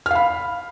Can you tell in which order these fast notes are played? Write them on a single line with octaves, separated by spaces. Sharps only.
F6 F5 B5